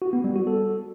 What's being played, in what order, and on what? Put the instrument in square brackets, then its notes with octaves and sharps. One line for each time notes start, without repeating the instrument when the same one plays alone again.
[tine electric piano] F#4
B3
G3
F#4
A4